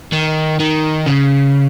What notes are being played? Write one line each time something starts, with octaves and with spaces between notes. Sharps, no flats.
D#3
D#3
C#3